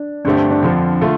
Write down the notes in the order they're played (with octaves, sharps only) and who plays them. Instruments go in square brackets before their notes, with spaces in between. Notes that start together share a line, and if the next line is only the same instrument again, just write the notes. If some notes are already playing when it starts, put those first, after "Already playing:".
Already playing: [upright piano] D4
[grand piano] G2 D3 A3 C4 G4 [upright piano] D4
[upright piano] D4
D4
[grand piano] F2 D3 F3
D3 A3 F4